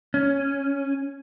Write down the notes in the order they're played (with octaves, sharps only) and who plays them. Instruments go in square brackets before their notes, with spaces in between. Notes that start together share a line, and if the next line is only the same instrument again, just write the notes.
[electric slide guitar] C#4